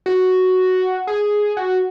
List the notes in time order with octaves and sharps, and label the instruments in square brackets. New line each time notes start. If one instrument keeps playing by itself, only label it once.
[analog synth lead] F#4
G#4
F#4